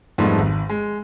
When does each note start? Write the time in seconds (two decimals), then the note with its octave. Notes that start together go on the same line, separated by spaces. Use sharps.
0.18 F2 G#2 G3 A3 B3
0.38 G#1
0.70 G#3